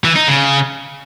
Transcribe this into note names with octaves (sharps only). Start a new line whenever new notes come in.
E3
D#4
C#3